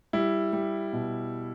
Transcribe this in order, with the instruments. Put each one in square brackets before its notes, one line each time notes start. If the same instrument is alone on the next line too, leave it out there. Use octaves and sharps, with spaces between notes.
[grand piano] G3 E4
G3
B2